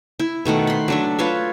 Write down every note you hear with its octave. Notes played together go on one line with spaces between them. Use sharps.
E4
B2 D#3 A3 F#5
B5 C6
F#3 D4 E5
F4 B4 C#5 E5